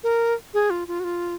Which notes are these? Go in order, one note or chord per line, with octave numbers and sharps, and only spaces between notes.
A#4
G#4
F4
F4
F#4
F4